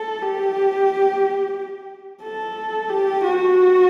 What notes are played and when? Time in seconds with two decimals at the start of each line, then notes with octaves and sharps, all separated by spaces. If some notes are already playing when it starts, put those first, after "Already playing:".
Already playing: A4
0.22 G4
2.23 A4
2.90 G4
3.24 F#4